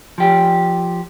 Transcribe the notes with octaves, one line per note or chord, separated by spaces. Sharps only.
F3 G4